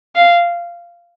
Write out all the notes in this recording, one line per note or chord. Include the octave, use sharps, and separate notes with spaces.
F5